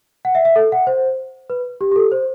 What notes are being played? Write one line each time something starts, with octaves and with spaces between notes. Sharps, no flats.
F#5
E5
E5
A4
F#5
C5
B4
G4
G4
A4
C5